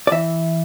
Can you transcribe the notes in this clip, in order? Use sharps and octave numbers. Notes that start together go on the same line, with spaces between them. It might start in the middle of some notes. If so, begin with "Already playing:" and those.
D5
E3 E5